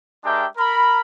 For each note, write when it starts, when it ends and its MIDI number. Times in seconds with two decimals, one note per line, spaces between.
0.25 0.45 56
0.25 0.45 62
0.25 0.45 67
0.25 0.45 70
0.25 0.45 76
0.25 0.45 79
0.57 1.01 70
0.57 1.01 83